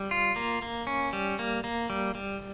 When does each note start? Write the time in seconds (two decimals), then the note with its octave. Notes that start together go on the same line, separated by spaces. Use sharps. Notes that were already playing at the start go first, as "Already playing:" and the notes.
Already playing: G3
0.11 F4
0.36 A#3
0.62 A#3
0.87 C#4
1.13 G3
1.39 A#3
1.64 A#3
1.90 G3
2.15 G3